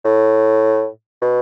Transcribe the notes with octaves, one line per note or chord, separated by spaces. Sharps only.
A2
B2